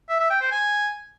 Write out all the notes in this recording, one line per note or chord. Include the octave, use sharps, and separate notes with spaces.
E5
E5
G5
C5
G#5